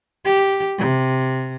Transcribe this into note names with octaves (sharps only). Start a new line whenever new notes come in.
G4
C3